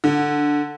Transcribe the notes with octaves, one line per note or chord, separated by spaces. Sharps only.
D3